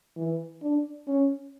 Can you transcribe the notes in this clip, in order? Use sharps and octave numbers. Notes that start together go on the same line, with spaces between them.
E3
D4
C#4